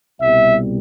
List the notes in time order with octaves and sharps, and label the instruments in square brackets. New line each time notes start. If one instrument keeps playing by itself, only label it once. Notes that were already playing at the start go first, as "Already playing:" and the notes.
[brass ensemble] C2 B2 G3 E5